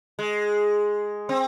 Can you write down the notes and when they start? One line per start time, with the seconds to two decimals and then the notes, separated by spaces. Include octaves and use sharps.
0.19 G#3
1.29 C4